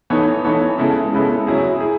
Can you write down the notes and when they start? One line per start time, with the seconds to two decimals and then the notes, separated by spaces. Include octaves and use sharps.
0.10 E3 B3 D#4 A4 C#5
0.45 E3 B3 D#4 A4 C#5
0.78 C#3 G#3 B3 E4 A4
1.13 C#3 G#3 B3 E4 A4
1.47 F#3 C#4 E4 G#4
1.80 E4 G#4